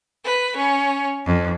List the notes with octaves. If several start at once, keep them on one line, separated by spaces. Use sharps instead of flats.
B4
C#4
F2